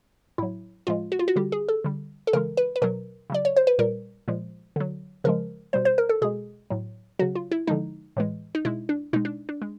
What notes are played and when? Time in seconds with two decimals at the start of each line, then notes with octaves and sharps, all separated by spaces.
0.38 A2 F#3 E4
0.87 A2 F3 G#3 F4
1.12 F#4
1.19 F4
1.28 F#4
1.36 D3 G3 G4
1.52 G#4
1.68 A4
1.84 D3 G3
2.27 A4
2.33 C#3 E3 G#3 A#4
2.57 B4
2.76 B4
2.82 B2 F#3 A#4
3.30 C#3 F#3 D5
3.45 C#5
3.56 C5
3.67 B4
3.79 A#2 G3 A#4
4.28 A#2 F3 G#3
4.76 D3 F#3
5.24 C#3 F3 G#3 A#4
5.73 B2 G3 C5
5.85 C5
5.98 A#4
6.09 A4
6.22 B2 G#3 G#4
6.70 A2 F#3
7.19 C#3 F#3 F#4
7.35 F4
7.51 E4
7.67 D3 F3 G#3 D#4
8.17 A2 E3 G#3
8.55 D#4
8.65 B2 G#3 E4
8.89 D4
9.13 B2 G#3 D#4
9.25 D4
9.49 D4
9.62 G#3